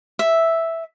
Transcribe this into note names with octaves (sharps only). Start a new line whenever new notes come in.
E5